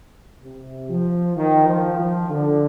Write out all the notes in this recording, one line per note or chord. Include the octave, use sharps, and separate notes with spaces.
C3
F3
D#3
F3
F3
D3